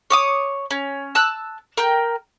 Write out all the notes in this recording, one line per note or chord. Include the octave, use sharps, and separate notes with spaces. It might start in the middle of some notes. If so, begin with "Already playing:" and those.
C#5 D6 D#6
C#4
A5 E6 F#6
A#4 G5